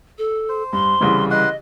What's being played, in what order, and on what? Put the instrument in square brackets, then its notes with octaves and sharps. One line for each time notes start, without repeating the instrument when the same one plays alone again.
[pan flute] A4
[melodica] C5
[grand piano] G2 [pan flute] C6
[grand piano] C2 C#3 E3
[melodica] B4 F#5 C6 [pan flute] D#5